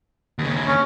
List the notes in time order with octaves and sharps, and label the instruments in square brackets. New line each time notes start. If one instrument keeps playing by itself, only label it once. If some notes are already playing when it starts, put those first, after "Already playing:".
[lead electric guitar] D#2 C#3
[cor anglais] C#4